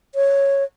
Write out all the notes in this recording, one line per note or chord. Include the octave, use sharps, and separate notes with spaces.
C#5